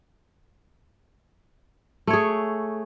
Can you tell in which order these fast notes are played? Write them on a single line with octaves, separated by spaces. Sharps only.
A3 C#5 G#4